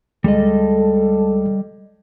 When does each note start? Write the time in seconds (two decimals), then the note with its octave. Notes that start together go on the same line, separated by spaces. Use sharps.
0.24 D2 G3 G#3 A4 D#5